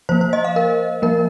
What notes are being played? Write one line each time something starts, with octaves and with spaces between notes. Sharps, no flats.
F3 A#3 C5
C5
D#5
F5
A#4
F3 A#3 A#4